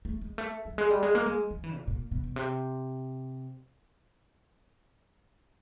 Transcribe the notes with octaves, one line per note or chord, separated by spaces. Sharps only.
A3
G#3
A3
F#3
G#3
G3
G#3
A#3
G#3
F3
E3
A#2
A#2
B2
B2
C3